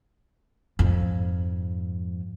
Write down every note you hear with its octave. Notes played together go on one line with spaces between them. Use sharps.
F2 G#2